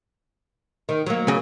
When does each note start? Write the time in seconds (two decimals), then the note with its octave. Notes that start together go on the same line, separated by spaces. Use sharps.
0.89 D#3
1.06 F#3 A#3
1.28 C#3